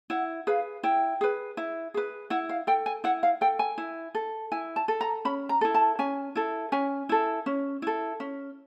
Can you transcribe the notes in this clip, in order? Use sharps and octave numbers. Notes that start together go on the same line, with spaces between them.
E4 F#5
G#4 B4 F5
E4 G5
G#4 B4
E4
G#4 B4
E4 F#5
F5
A4 G5
G#5
E4 F#5
F5
A4 G5
G#5
E4
A4
E4 G#5
A5
A4
A#5
C#4 B5
A#5
E4 A4
A5
C#4 G#5
E4 A4
C#4 G#5
E4 A4
C#4
E4 A4
C#4